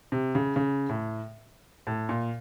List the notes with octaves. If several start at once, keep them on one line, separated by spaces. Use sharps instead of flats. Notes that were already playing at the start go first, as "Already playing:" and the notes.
C3
C#3
C#3
A2
A2
A#2